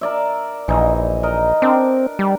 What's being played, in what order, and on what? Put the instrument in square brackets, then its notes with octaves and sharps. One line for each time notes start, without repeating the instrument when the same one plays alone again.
[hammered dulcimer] A#4 D5 E5
[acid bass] A#1 [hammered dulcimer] E3 D#4
[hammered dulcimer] A#4 D#5
[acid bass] C4 [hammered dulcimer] D4 A#4
[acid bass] G3